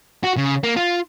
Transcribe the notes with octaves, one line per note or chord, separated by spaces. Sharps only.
F#4
C#3
A#3
F4